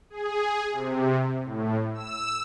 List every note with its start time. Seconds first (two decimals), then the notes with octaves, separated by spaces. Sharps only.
0.10 G#4
0.72 C3
1.44 A2
1.94 E6